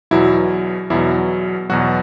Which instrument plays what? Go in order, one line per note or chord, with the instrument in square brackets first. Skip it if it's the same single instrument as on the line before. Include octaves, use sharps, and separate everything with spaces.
[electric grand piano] E2 B2 F#3 E4
E2 B2 F#3 E4
E2 B2 F#3 F#4